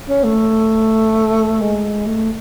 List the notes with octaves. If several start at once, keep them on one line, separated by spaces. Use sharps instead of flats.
C#4
A3
G#3
A3